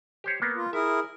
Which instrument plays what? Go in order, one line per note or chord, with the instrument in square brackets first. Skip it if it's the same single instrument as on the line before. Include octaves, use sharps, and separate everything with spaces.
[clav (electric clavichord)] G4 C5 C#5
A#3 B3
[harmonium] F4
[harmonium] E4 G#4 A#4 [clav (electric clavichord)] E5